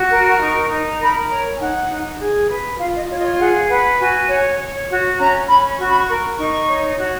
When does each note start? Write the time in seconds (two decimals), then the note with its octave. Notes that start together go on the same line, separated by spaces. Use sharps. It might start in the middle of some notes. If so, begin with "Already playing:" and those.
Already playing: F#4
0.10 A#4
0.40 D#4 C#6
0.70 D#4
0.99 A#4 B5
1.30 C#5 A#5
1.55 G#5
1.59 D#4 F#5
1.90 D#4
2.20 G#4
2.50 B4
2.79 F4 F5
2.95 D#5
3.10 F4 C#5
3.18 D#5
3.24 C#5
3.40 G#4 F#5
3.70 B4 F#5
3.99 F#4 G#5
4.29 C#5
4.59 C#5
4.89 F#4
5.19 C#4 A#5
5.48 C#4 B5
5.78 F#4 C#6
5.89 B5
5.99 C#6
6.09 A#4
6.38 D#4 C#6
6.69 C#5
6.99 F#4